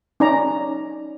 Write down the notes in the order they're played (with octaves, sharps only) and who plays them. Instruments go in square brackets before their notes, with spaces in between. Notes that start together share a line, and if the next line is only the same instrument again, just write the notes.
[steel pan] C#4 D#4 D5 G#5 A#5